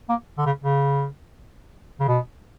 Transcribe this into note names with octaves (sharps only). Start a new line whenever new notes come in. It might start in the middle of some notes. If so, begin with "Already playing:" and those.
A#3
D3
C#3
C#3
C#3
B2